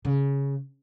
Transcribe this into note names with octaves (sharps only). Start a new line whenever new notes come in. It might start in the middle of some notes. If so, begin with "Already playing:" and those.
C#3